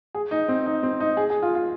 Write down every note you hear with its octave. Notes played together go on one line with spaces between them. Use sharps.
G#4
D#4
C4
D#4
C4
D#4
G#4
G#4
F4
F4